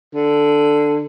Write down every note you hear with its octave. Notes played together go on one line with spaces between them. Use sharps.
D3